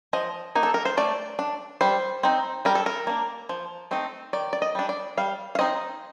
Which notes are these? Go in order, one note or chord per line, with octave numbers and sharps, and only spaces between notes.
F3 D#5
A#3 D#4
A4
A#4
C5
A3 D5
D4
G3 C5
C4 D#4
G3 A#4
A4
A#4
A#3 D4
F3
A3 C4 D#4
D#3 D5
D5
D#5
G3 D4
D5
G3 F5
F5
C4 D#4 D#5